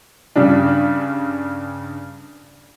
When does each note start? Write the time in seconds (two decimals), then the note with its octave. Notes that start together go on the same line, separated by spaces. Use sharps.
0.36 G2 C#3 G3 D4